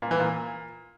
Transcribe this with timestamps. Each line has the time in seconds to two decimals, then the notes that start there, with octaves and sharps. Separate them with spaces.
0.02 A#2
0.11 E3
0.20 A#2